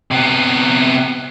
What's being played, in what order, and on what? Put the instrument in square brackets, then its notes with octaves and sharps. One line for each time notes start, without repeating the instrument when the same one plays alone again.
[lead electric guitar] C3 B3